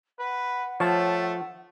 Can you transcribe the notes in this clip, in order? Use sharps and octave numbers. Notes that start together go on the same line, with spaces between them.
B4 F#5
F3 A3 C#5 A5